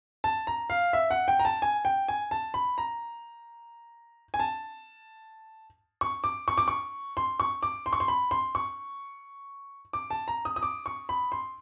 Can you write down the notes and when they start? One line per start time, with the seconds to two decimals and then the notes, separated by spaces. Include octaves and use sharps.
0.24 A5
0.47 A#5
0.70 F5
0.93 E5
1.11 F#5
1.28 G5
1.39 A#5
1.45 A5
1.62 G#5
1.85 G5
2.08 G#5
2.31 A5
2.54 B5
2.78 A#5
4.34 G#5
4.40 A5
6.01 C#6
6.24 D6
6.48 C#6
6.58 D6
6.68 C#6
7.17 C6
7.40 C#6
7.63 D6
7.86 C6
7.93 C#6
8.00 C6
8.08 B5
8.31 C6
8.55 C#6
9.93 D6
10.11 A5
10.28 A#5
10.45 D#6
10.56 D#6
10.63 D6
10.86 C#6
11.09 B5
11.32 C6